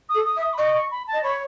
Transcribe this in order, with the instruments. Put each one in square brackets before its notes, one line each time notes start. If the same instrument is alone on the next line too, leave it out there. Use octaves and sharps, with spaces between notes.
[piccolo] D#6
[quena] A4
[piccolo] D#6
[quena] E5
[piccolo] D#6
B5
[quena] D#5 [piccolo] C#6
[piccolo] C#6
B5
A5
[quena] D#5
[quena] C#5 [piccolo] B5